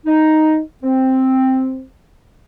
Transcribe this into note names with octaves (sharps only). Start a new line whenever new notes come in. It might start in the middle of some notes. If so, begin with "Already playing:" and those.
D#4
C4